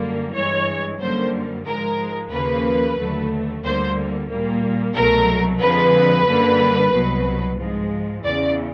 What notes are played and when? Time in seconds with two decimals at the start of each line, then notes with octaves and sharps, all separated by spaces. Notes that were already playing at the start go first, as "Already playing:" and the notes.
Already playing: F#2 D3 G3 A#3
0.34 G2 E3 G#3 C#5
1.00 F#2 D3 G3 A#3 C5
1.66 G#2 F3 G#3 A#4
2.31 D#2 C#3 F3 A#3 B4
2.97 D#2 D3 F#3 A3
3.63 D2 D3 G3 A#3 C5
4.29 A#2 G3 A#3
4.95 C2 B2 F#3 A3 A#4
5.61 F2 D3 F3 G#3 B4
6.26 F#2 D3 G3 A#3
6.92 C2 B2 F#3
7.58 G#2 F3 G#3
8.23 E2 C#3 E3 D5